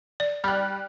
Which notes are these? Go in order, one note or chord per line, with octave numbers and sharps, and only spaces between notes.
D5
G3 F6 F#6